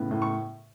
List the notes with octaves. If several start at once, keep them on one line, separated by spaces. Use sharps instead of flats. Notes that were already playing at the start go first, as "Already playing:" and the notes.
Already playing: A2 C#3 B3
A2
C#6